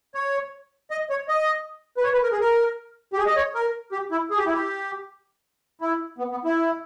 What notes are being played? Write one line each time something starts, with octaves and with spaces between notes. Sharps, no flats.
C#5
D#5
C#5
D#5
B4
C#5
B4
A#4
G#4
A#4
G4
G#4
D#5
C#5
A#4
G4
E4
G#4
G4
E4
G4
E4
B3
B3
E4